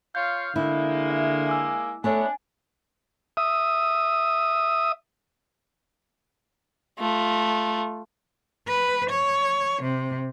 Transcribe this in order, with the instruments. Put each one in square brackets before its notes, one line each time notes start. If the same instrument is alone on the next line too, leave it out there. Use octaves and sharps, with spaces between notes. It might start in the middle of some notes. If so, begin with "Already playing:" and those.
[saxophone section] F4 C#5 F5 [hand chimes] G6
[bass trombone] D3 [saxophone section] G#3 A#3 [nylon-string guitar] E4
[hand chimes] E5
G#5 D6 E6
[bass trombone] A3 [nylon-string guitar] B3 C#5 E5 [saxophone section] D4 [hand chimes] G#5
[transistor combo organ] E5 D#6
[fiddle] A3 F4
[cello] B4
C#5
C3